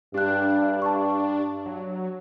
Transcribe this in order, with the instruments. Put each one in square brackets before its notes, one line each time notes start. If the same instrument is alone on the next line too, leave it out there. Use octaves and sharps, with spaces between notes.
[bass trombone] G2 [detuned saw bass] D4 [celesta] G4 F#6
[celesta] A5 C#6
[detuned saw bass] F#3